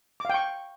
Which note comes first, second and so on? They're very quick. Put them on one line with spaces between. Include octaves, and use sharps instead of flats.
D6 F5 G5 C#6